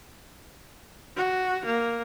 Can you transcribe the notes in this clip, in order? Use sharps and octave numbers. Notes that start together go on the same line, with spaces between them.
F#4
A#3